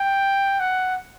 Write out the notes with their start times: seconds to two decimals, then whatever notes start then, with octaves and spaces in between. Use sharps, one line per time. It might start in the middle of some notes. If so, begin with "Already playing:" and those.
Already playing: G5
0.60 F#5